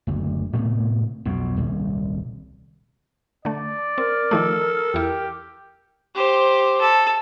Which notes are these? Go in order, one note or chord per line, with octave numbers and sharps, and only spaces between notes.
F#1 D2
A2 C3 A3 B3
B1 F2 B2
D#1 C2
D3 A3 D5
C4 A#4
D#3 F3 A3 A4
E2 E4 G4
G4 C5
A4